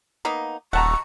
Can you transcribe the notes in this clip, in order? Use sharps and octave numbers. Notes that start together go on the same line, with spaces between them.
A#3 B3 D#4
D#1 A3 F#5 A5 A#5 C#6